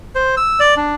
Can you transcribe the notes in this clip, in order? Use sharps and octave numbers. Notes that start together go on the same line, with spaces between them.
C5
E6
D5
D4